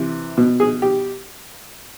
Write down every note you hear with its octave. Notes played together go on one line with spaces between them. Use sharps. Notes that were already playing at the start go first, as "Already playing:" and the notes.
Already playing: C3 E3
B2
G#4
G4